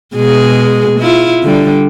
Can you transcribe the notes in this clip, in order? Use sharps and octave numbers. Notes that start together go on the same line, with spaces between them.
B2 G#3 G#4
E4 F4
D3 G3